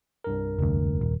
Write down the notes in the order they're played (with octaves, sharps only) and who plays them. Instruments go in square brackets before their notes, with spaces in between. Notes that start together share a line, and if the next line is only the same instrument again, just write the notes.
[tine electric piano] C2 G2 A#4
[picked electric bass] F1 D2
D#1